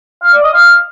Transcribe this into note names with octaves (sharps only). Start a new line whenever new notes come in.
F5
D5
D#5
F5